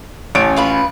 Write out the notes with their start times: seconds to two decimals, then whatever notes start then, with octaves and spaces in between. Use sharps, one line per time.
0.35 A1 C#4 A5 D7
0.56 F4 B4 B5